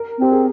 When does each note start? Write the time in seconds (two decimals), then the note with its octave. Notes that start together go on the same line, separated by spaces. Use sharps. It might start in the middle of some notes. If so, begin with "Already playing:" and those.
Already playing: A#4
0.19 C4 G4
0.31 G#4